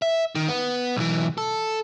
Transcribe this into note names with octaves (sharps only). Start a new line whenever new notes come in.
E5
D#3
B3
B1 E3
A4